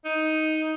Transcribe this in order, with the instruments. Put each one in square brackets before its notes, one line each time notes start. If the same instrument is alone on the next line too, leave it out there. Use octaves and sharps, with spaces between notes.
[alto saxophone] D#4